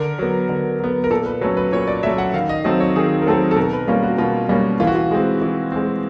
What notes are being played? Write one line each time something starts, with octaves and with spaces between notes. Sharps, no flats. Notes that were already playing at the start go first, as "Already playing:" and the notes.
Already playing: D3 A#4
F#3 B3
D3
F#3 B3
A#4
A#2 A4
B4
F#3 A3 C#4 B4
B4
A#2 C#5
D5
F#3 A3 C#4 E5
F#5
D#3 F5
D#5
F#3 A3 C4 D#5
C#5
D#3 G#4
A#4
F#3 A3 C4 A4
A4
B2 A#4
B4
G3 A#3 C#4 F4
F#4
B2 F4
G3 A#3 C#4
E3 F4
F#4
F4
G#3 C4
E3
G#3 C4